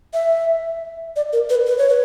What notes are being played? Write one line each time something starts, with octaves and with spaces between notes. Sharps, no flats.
E5
D5
A#4
B4
B4
C#5
B4